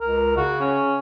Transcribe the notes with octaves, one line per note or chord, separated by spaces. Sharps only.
C#2 A#4
C#3 F#4
C#4